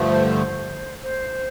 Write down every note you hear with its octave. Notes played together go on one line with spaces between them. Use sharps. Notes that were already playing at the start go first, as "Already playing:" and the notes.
Already playing: G2 D3 F3 A3
C5
C5
C5